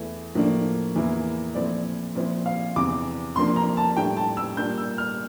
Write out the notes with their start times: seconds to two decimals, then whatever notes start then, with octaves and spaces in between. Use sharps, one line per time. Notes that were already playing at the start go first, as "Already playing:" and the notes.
Already playing: E2 E3 A3 E4
0.35 A2 F3 A#3 D4
0.95 E2 E3 A#3 E4
1.55 A#2 F3 A3 C4 E4 D5
2.15 A#2 F3 C4 E4
2.46 F5
2.76 E2 C3 E3 D6
3.36 C3 F3 A#3 D4 C6
3.56 A#5
3.77 A5
3.97 A2 G3 D4 G5
4.17 A5
4.37 E6
4.57 A#2 G3 A#3 D4 G6
4.78 E6
4.98 F6